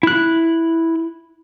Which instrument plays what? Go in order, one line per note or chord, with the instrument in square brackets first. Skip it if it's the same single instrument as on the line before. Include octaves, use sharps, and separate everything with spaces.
[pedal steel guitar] E4 F#6